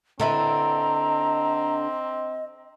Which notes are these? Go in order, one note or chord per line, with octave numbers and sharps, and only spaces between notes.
D3 C4 E4 B4 D#5 A#5